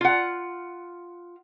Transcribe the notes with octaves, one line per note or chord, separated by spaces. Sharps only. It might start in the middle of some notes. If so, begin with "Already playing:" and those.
F4 F#5